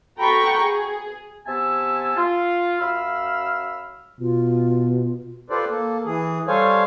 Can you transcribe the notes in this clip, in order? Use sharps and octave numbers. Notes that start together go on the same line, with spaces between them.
F#4 A4 G5 A#5 B5 C#6
G#4
C3 B3 E5 G#5 A5 E6
F4
F#2 F5 B5 E6 F6
B2 F4
F4 G4 A4 B4 C5 D5
A#3 A4
E3 G#4
G3 A4 C5 C#5 F5 G#5